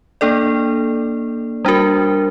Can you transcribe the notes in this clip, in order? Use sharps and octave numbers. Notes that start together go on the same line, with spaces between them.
A#3 D4 A4 D5
G3 D4 F#4 A#4